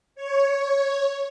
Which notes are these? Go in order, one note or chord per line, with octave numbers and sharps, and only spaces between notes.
C#5